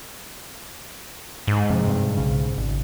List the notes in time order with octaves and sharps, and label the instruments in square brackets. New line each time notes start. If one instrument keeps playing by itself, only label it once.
[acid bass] G#2
[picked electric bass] F2 C3
G2 C3
B1 C#3
G#1